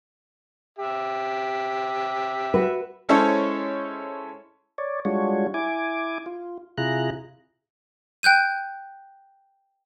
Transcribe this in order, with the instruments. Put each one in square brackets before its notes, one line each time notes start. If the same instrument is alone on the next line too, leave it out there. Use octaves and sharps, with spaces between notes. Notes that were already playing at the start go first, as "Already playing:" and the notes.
[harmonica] G4 E5
[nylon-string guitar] F#4 B4
[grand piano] G#3 C#4 E4 A4 C5 C#5
[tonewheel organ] C#5 D5
G3 G#3 D4 F4 F#4 C#5
E4 G#5 D6
F4
C3 E4 F4 G#4 A#5 F#6
[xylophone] G5 F#6 G6 D#7